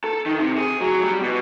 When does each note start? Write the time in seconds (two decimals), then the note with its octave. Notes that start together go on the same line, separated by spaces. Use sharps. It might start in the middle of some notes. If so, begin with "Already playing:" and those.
0.04 A4
0.26 D#3
0.40 C3
0.58 G#4
0.81 F#3
1.03 G3
1.22 B2